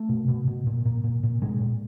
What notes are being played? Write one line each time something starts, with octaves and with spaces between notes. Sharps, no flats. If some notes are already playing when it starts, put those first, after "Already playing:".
Already playing: A3
B2
B2
B2
A#2
A#2
A#2
A#2
A#2 G#3
A#2